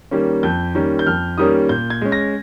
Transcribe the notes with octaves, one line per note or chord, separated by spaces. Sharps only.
D#3 G3 A#3 C#4
F2 G6
D#3 G3 A#3 C#4
G6
F2 F6
D#3 G3 A#3 C#4 D#6
A#2 G6
G#6
G#3 C#4
A#6